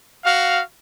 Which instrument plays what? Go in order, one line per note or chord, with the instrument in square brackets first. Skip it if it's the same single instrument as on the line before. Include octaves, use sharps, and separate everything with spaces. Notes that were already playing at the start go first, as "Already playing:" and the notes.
[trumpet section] F#4 F5